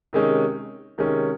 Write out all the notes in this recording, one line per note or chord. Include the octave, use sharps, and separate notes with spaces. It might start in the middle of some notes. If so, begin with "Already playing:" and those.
C3 D#3 G#3 C#4
C3 D#3 G#3 C#4